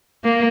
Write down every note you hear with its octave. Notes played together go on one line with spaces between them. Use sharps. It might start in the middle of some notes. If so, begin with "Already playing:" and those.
A#3